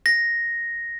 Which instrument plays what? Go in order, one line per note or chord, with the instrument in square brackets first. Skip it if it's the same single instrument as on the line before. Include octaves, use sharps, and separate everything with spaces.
[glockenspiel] A#6